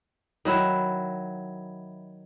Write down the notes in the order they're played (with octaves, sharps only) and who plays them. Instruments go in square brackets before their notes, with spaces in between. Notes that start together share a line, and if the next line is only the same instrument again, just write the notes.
[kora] D#3 F#3 E4